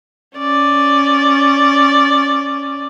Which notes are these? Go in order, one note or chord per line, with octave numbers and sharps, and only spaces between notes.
C#4 D5